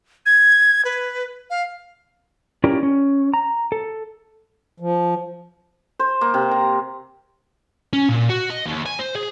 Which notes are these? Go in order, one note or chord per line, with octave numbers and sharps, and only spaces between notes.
G#6
B4
F5
C#4 E4 F4 G4 A#4 D5
C#4
A#5
A4
F3
C5
A#3
C3
A#5
C#4
A#2
F#4
D#5
D#2
G#5
C5
G#4